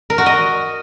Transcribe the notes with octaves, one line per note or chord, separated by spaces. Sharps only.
A#4
F#4
D#5